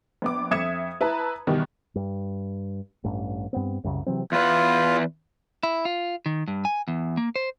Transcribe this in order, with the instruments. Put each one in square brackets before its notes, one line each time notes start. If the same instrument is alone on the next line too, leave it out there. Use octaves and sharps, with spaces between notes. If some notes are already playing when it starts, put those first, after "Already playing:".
[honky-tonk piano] A#1 B3 D6
F2 E5 D#6 G#6 C#7 E7
E4 B4 A5 A#5
B2 D#3 E3 G3
[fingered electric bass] G2
A1 G2
G2 B3 C4
C2 F#2 C#3
C3 E3 F#3 C4
[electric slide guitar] E2 B4 [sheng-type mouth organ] F4
[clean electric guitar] E4
F4
D#3
G2
G#5
E2
A#3
C5